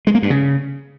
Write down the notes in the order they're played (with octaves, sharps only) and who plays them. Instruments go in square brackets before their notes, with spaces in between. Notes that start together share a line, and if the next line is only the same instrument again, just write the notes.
[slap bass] G#3
A#3
G2
C#3